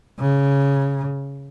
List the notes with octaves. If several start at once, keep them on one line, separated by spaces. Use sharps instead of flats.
C#3